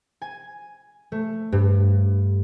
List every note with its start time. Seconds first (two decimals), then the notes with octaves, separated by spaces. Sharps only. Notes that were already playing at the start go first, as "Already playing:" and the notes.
0.22 G#5
1.12 A3
1.52 G2